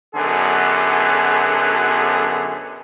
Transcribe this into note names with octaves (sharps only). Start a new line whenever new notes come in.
B1 F#2 D3 B3 G#4 A4